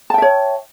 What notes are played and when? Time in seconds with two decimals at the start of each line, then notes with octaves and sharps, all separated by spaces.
0.10 A5
0.14 G5
0.18 E5
0.22 C#5